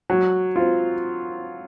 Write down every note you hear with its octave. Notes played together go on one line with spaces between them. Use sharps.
F#3
C4 F4